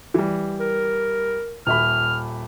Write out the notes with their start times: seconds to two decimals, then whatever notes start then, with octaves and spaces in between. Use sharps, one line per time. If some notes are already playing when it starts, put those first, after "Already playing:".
0.14 E3 G3
0.60 A#4
1.67 D#1 E5 B5 F6